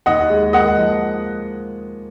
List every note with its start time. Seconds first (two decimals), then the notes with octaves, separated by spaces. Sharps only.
0.06 D#2 D#5 F#5
0.30 G#3
0.53 A#3 D#5 F#5
0.78 F3